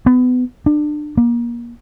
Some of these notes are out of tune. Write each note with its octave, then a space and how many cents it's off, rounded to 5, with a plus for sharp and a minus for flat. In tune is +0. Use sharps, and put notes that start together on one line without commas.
B3 +25
D4 +30
A#3 +30